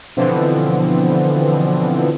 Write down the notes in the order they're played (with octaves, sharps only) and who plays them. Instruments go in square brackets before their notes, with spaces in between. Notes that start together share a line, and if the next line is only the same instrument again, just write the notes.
[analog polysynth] B2 D3 E3 F3 B3 C4